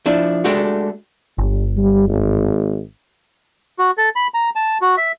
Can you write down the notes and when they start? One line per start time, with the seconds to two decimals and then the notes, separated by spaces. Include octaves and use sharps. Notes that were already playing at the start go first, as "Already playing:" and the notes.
0.06 F3 D4 E4
0.45 G#3 A3 D4 F#4 G4
1.38 G1 G2
1.77 G3
2.08 G#1
3.79 F#4
3.98 A4
4.16 B5
4.34 A#5
4.56 A5
4.82 F#4
4.98 E5